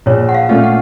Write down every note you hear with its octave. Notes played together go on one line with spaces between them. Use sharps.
A#1 C#5
F#5
F5
A#2 A3 C#4 F4
F#5